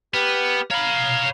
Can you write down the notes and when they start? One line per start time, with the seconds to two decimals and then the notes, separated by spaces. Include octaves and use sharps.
0.14 B3 G4 B4 F6
0.71 C#5 F5 A#5 B5